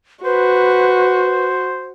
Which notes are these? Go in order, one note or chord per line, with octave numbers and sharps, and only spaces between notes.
F#4 B4 C5